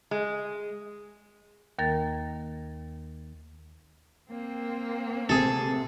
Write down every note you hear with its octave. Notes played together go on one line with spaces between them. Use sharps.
G#3
D#2 D#3 A#3 A#4 G#6 A6
A#3 C4
C3 G#4 A4